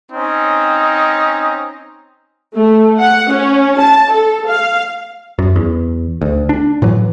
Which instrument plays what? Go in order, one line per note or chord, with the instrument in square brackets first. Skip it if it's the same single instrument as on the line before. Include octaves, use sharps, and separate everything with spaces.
[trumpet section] C4 C#4 D#4
[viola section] A3
F#5
C#4
A5
A4
F5
[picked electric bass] F#2
E2
D2
D4
A2 E3 F#3